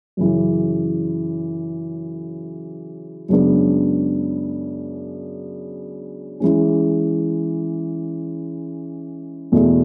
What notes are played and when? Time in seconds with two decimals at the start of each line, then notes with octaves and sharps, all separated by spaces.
0.17 F#2 C#3 E3
3.29 F#2 C#3 G#3 B3 D4
6.40 E3 G#3 C#4
9.52 E2 B2 A3